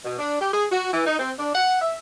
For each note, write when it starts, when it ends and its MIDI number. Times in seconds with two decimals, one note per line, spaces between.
0.04 0.19 47
0.19 0.40 62
0.41 0.53 67
0.53 0.66 68
0.72 0.90 66
0.92 1.05 52
1.07 1.18 63
1.20 1.32 60
1.39 1.50 62
1.55 1.81 78
1.82 1.96 76